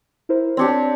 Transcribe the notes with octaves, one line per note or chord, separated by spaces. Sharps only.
E4 A#4 C5
C4 D4 G4 C#5 G#6 C#7